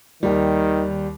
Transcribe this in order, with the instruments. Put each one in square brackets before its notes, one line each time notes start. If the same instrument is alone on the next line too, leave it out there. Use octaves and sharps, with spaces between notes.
[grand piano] D#2 G3 [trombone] D#3